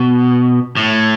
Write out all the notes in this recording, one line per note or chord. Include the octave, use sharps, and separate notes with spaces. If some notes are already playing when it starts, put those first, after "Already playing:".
Already playing: B2
A2